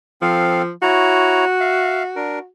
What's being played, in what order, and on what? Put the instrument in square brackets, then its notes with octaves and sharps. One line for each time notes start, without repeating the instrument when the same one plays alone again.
[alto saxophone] F3 [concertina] C4 A4 F5
[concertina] E4 C#5 A#5 [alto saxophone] F#4
[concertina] E5 F5
D4 A#4